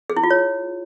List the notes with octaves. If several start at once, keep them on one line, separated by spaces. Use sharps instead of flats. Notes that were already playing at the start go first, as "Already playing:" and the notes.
G#4
E4
F4
C#5